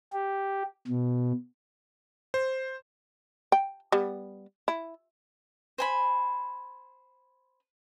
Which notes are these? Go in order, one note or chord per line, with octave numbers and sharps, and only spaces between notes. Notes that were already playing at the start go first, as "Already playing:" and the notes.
G4
B2
C5
G5
G3 B3
E4
C5 G#5 B5